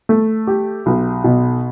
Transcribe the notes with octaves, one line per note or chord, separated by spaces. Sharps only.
A3
G4
B1
B2